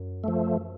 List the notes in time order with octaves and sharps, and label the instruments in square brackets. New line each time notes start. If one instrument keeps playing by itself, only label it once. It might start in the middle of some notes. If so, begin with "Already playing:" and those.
Already playing: [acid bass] F#2
[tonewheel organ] F3 A3